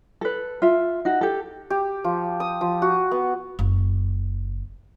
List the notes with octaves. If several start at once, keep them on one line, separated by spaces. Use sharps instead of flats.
A4 B4
F4 E5
D#4 F#4
G4 A4
G4
F3
D#6
F3
F#4
B3
F#1